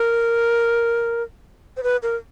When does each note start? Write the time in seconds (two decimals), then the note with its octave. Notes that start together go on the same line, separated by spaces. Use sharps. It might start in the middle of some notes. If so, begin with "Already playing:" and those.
Already playing: A#4
1.77 C5
1.83 B4
2.03 A#4